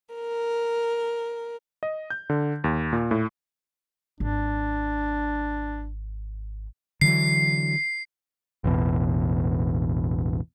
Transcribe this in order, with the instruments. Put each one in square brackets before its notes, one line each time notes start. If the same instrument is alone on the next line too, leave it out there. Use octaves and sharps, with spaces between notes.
[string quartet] A#4
[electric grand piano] D#5
G6
D3
D#2
A#2
A2
[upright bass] G#1 [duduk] D4
[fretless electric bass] D3 E3 F#3 [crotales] C7
[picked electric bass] A1 E2 B2